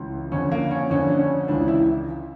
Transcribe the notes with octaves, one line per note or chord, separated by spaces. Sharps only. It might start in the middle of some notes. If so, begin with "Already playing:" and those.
Already playing: C#2 C#3 E3
F2 D3 C#4
A#3
C#4
F2 D3 C#4
D4
C#4
C#2 C#3 E3 D4
E4